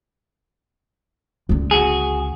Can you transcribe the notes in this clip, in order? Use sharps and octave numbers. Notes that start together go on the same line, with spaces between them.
C#2 D3
F#4 G#4